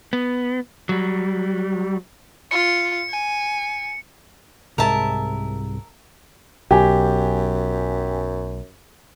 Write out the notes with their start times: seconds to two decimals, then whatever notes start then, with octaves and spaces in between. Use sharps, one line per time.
0.13 B3
0.89 F#3 G3
2.51 F4 C#7
3.10 G#5
4.78 C2 G#2 G#3 A#4 E5 A5
6.71 B1 F#2 G4 G#5